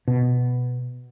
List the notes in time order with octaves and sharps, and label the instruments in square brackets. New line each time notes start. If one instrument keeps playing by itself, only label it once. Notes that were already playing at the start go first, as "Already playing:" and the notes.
[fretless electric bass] B2